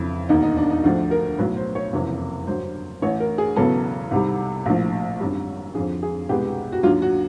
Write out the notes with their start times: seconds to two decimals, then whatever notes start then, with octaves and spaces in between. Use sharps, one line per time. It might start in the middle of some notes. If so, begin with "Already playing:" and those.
Already playing: F2 C#3 E3 E4
0.29 E1 D#2 D#3 D#4
0.43 D#4
0.57 D4
0.70 D#4
0.84 D2 D3 F3 A3 D4
1.11 A#4
1.38 B1 A2 F#3 B3 B4
1.57 C5
1.75 C#5
1.93 F#1 F2 C3 E3
2.47 G2 D3 F#3 C5
3.02 A1 A2 E3 C#5
3.20 A#4
3.38 G#4
3.56 E1 E2 C#3 F#3 B3 A4
4.11 C2 C3 D#3 G3
4.66 A#1 A2 F3
5.20 G#1 F#2 D3 G3
5.75 F2 D3 F3 G#4
6.03 G#4
6.29 C2 B2 G#3 B3 G4
6.72 F#4
6.83 D#2 D3 F#3 F4
7.02 F#4